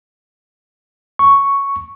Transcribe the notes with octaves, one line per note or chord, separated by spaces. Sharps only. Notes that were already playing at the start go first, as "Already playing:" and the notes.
C#6